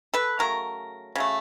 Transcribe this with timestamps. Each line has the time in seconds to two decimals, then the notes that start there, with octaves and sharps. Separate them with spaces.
0.14 A4 B4
0.39 C#3 F#3 A3 A#4
1.15 C#3 F#3 A3